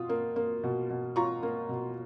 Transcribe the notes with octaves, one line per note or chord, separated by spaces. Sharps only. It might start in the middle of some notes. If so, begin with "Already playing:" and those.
Already playing: B2 F4 D#6
A#3
A#3
B2
B2
F4 A#5 C#6
A#3
B2